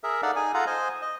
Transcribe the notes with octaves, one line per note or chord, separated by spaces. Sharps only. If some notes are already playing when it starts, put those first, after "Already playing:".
G#4 A#4 E5
D#4 A4 D5 F5 F#5
D#4 G#4 G#5
F4 A4 F5 F#5 A#5
C5 D#5 G#5
D#5